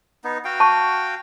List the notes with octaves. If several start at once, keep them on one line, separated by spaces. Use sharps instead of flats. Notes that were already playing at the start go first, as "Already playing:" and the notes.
B3 D#4
F#4 F5 G5
A5 C#6